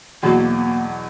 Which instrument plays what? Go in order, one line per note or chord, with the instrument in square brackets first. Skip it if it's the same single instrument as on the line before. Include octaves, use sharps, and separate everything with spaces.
[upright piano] E2 B2 F#3 [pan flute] A#3